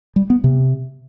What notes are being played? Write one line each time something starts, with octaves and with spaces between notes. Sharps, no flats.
G3
B3
C3